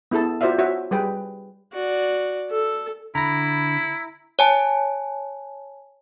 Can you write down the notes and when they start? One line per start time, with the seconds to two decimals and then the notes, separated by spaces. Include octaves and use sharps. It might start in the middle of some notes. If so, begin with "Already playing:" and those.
0.11 B3 E4 G#4 A4 A5
0.41 F4 F#4 C5 D5 E5 F5
0.59 F#4 C#5 E5
0.91 G3 G#4 B4 G5
1.73 F#4 D5
2.50 A4
3.15 D3 E4 A#5 B5 A#6
4.39 C#5 G#5 A5